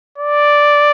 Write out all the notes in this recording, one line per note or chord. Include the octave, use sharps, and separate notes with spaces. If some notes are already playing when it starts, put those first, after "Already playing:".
D5